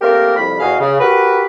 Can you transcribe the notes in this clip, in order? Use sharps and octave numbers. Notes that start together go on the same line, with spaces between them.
A3 A#3 C4 G4 A#4
C2 F2 B5
E2 F#4 G#4 D#5 F5
C#3
F#4 G4 A#4 B4